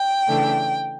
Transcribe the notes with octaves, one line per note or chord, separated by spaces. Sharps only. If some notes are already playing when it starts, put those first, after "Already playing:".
Already playing: G5
C#3 E3 A3 D4